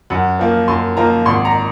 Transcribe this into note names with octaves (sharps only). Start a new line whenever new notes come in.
F#2 F#5
F3 A#3 F4
F#2 C6
F3 A#3 F4 A#5
G#1 C6
A#5